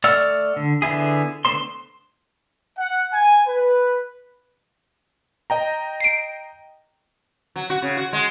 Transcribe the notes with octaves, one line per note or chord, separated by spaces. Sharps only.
A3 D5 F#5 E6 F6
D3
D3 B3 E4 G#4
D3 A3 B3 C5 C6
F#5
G#5
B4
D#5 G5 A#5
C7 D7
F#3
F#4
C#3
F#4
G#3